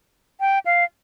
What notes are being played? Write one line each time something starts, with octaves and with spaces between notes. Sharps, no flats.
G5
F5